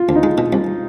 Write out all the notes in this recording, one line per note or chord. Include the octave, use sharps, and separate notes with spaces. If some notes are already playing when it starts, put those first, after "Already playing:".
Already playing: F4
D2
D#4
G#3
B2
C2